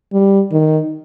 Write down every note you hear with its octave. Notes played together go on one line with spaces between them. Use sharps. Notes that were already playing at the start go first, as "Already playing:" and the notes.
G3
D#3